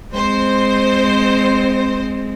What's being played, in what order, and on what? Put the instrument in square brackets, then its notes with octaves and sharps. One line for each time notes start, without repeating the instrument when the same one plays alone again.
[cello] G#3 C4 [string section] C5